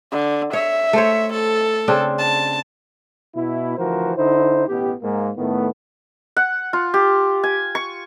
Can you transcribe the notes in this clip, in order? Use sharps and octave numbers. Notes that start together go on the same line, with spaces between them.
D3
C#5 E5
A3 C5 C#5
A4
C#3 C4 D4
A5
B2 E4
D2 E3 F3 F#4 A#4 C5
D3 D#4 E4 C5
A1 B2 G4
G#2 A#3
A2 D#3 A3 B3
F#5
F4
G4
G#5
C#6